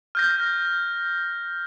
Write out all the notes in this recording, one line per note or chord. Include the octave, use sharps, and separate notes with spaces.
F6 G6 A#6